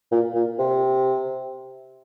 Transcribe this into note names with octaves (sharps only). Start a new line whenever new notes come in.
A#2
A#2
C3